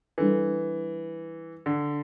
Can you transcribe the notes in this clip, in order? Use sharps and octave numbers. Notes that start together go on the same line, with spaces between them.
E3 G3 D4 A4
D3